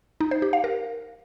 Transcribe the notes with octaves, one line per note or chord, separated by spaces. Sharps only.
D#4
C5
G4
F5
A#4